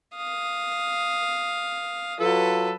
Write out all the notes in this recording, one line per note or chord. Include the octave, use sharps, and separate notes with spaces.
F5 D#6
F#3 F4 A4 B4